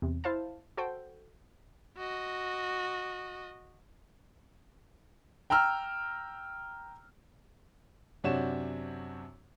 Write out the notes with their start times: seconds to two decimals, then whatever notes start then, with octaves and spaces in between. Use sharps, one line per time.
0.02 E2 C3
0.24 E4 C5 F5 A5
0.77 F#4 A4 C5 G5
1.97 F#4 D#5
5.50 G5 A#5 E6 F6
8.24 F#2 C3 D4 C#5 F#5 E7